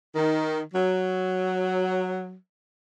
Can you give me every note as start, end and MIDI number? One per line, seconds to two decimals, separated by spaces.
0.15 0.60 51
0.73 2.35 54